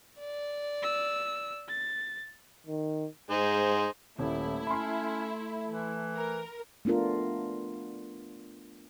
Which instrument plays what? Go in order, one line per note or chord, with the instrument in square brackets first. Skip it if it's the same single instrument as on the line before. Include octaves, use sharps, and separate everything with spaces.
[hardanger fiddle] D5
[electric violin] E6
A6
[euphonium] D#3
[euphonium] G#2 [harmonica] D#4 G#4 C5
[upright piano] D#1 [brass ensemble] A3 [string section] E4
[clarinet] C#4 [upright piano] B5 C6
[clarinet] E3
[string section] A#4
[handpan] A3 B3 D4 F4 A#4